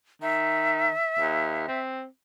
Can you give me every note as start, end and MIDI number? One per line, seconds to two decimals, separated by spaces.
0.22 0.90 51
0.22 1.79 76
1.19 1.66 39
1.68 2.05 60